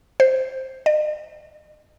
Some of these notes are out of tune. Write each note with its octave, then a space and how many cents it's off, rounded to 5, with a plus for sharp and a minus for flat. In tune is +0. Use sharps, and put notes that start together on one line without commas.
C5 +0
D#5 -45